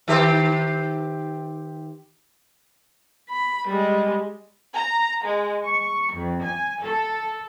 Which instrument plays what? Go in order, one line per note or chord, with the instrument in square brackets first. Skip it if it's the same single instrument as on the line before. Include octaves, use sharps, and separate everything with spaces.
[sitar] D#3 G4 C5
[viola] B5
G3 G#3
[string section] A#5
G#3
C#6
F2
G#5
A4